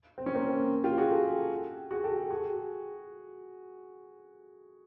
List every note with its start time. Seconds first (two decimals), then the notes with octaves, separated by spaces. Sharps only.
0.18 C4
0.26 C#4
0.35 A#3 C4
0.84 F4 G4
0.98 F#4 G#4
1.10 G4 A4
1.91 F#4 G#4
2.04 G4 A4
2.30 F#4 G#4